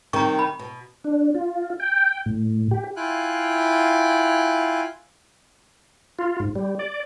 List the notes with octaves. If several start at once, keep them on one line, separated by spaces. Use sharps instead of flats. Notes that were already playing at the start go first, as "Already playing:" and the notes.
C3 D#3 G3 A#5 C#6
B5
B2
D4
F4
G5
A2
G4
E4 F4 F5 G5 G#5 F#6
F4
G#2
G3
D5